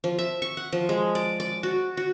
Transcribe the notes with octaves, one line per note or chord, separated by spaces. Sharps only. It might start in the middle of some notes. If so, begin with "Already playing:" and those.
F3
E5
C#6
F#5
F3
G#3
D5
D5
F#4
F#4